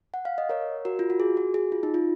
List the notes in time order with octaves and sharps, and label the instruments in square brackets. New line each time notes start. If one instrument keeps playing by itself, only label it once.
[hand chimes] F#5
F5
D#5
A#4 C#5
F#4 A#4
F4
F#4
G#4
F#4
G#4
F4
D#4
F4